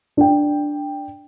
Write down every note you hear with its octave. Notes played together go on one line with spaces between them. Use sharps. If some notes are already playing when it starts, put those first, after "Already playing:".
D4 G5